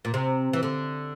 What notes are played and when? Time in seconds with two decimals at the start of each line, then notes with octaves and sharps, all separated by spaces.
0.05 A#2
0.14 C3
0.53 E3
0.63 D3